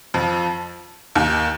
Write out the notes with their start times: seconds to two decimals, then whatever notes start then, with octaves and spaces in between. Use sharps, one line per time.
0.14 F2 F3
1.15 D#2 D#3